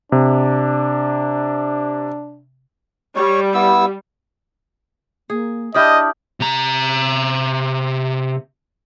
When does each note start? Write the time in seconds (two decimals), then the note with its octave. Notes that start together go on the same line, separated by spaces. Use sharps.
0.12 C3 D4
3.16 G3 C#5
3.54 B3 E4 E6
5.30 A#3 G#4
5.75 D4 E4 G4 D5 D#5 D#6 F6 G6
6.40 C3 A#5